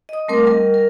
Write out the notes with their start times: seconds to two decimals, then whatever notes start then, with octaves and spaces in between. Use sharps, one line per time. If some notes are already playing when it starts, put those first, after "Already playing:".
0.09 D#5 D#6
0.28 G3 A3 C4 A#4 D6
0.46 G3 A#4 D#5
0.74 A#4